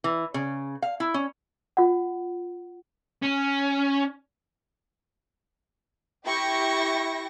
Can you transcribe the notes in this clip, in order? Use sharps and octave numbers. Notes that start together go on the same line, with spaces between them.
E3
C#3
F5
E4
C#4
F4 F#5
C#4
E4 G4 G5 C#6 A#6